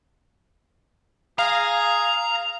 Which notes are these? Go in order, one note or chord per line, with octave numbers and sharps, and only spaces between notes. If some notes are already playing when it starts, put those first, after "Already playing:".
G#4 F5 A#5